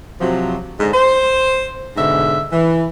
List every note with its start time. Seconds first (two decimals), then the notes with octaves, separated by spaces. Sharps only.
0.19 C3 F3 F#3
0.78 G#2 D3
0.92 C5
1.96 G#2 B2 D3 E5
2.52 E3